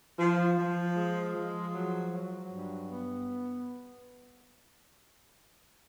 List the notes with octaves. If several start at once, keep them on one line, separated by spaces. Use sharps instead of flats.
F3
F3
G#3
F3
F#3
F#3
G2
B3